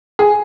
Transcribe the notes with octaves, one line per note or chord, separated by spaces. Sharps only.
G#4